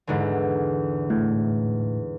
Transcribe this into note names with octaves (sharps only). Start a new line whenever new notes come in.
E2 G#2 D3
A2